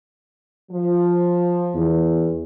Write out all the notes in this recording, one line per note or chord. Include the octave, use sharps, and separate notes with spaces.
F3
E2